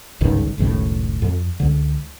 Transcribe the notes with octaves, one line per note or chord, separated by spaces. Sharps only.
G1 C#2 G#2 D#3
F#1 C#2 A2 D#3
F2
C#2 D3